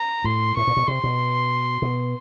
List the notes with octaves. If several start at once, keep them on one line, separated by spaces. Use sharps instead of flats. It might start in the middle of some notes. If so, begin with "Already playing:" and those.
Already playing: A#5
A2 C6
A2 C#6
A#2
B2
C3 C6
B2
B2